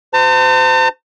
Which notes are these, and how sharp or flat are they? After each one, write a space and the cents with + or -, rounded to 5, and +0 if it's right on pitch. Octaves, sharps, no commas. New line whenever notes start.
F#4 +0 C5 -35 A5 +45